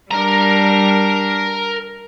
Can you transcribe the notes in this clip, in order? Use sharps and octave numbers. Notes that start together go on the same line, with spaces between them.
G3 D4 A#4 A#5